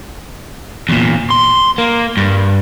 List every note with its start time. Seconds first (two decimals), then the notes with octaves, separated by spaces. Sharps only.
0.89 E2 A#2
1.30 C6
1.78 A#3
2.17 G2